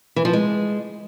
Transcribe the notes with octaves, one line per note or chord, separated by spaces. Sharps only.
E3
F3
G#3